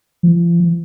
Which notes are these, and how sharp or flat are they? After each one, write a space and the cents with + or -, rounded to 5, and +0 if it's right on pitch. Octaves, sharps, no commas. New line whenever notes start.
F3 -40